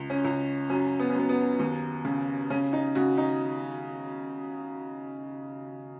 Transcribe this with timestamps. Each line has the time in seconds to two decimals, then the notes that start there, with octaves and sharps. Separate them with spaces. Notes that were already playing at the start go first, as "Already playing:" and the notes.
Already playing: C#2
0.10 C#4
0.25 C#2
0.69 F#2 C#4
1.00 B3
1.09 C#4
1.15 F#2 B3
1.29 B3
1.59 D#2
2.05 C#3
2.50 C#3 C#4
2.73 D#4
2.95 C#3 F#4
3.18 D#4